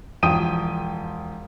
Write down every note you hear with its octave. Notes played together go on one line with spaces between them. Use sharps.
E1 F3 G5 D#6 D#7